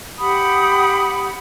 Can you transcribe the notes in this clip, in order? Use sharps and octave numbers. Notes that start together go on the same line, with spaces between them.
G4 F#5 B5 D#6